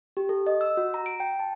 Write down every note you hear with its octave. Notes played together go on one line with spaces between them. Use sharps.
G4
A4
D#5
E6
F#4
A#5
D7
G5
A5